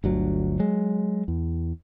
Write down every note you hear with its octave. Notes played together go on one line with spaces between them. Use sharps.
G1 D2 F#3
F#3 G#3
E2